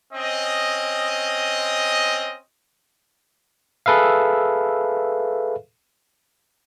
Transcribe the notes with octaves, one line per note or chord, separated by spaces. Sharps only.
C4 C#4 D#5
G#4 A4 B4 E5 F5